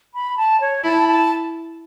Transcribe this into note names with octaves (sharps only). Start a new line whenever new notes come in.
B5
A5
C#5
E4 A5
A5